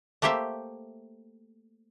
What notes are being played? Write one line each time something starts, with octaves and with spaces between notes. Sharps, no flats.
A3 A#3 G4 C5 E5